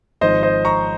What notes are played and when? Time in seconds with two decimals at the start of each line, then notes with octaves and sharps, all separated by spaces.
0.21 G#1 G#2 F3 C5 D#5
0.43 C5 D#5
0.65 A#5 C#6